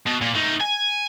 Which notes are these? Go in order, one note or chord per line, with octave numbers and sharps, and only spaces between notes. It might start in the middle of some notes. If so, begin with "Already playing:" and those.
B2
A#2
A3 D#4
G#5